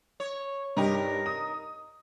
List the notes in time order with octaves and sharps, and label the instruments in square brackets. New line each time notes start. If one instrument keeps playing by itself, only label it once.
[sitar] C#5
[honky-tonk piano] G2 G4 [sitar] D#4 A#4
[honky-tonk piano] D#6